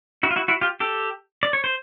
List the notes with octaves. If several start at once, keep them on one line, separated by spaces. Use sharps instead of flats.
E4 F#4
F4
E4 F#4
E4 F#4
F4 G4
G4 A4
D5
C#5
C5